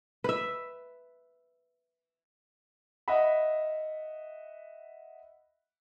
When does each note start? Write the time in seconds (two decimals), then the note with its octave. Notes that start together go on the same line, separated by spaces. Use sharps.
0.24 B4 E5
3.08 D#5 E5 F#5 B5